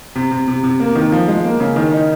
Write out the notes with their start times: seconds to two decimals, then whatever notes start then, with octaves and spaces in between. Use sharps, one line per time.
0.15 C3
0.31 C3
0.48 C3
0.63 C3
0.80 A#3
0.95 D#3
1.12 F3
1.28 G#3
1.44 A#3
1.60 C#3
1.76 D#3
1.92 D#4